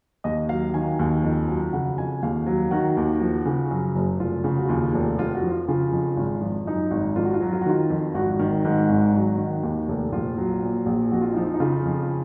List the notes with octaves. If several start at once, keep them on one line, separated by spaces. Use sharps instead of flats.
D#2 D#5
F#3 F5
D#3 G#5
D#2
F2
F#3
C#3 F#5
F2 G#5
D#2 F5
F#3
D#3 F#4
D#2
F3
C#3
F#2
F#1
F1 F4
C#3
F#4
D#2 F4
F1
F2 F4
F#4
F3
F4
C#3 F4
F2
G#1
F3
F#2 D#4
G#1
F2 F4
F#4
F4
F#3 F#4
F4
F#4
D#3 F4
F2
G#1 F#4
D#3
G#2
G#1
F#3
D#3
D#2
F1
A#1 F4
F#3
A#2
A#1
F2 F#4
F4
F3 D#4
F4
D#4
C#3 F4
F2